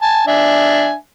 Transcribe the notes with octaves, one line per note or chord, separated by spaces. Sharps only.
G#5 A5
D4 E5 G#5